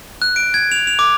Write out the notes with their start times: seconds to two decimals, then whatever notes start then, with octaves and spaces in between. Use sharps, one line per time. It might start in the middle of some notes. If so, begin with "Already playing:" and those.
0.22 F#6
0.36 D7
0.54 G#6
0.72 F7
0.87 F7
0.99 D6